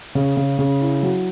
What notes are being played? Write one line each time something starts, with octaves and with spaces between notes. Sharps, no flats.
C#3
C#3
C#3
E4
F#3